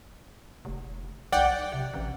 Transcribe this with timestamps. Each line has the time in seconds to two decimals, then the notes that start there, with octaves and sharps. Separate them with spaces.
0.65 F1
1.32 B1 D5 F#5 G5
1.72 C3
1.94 A1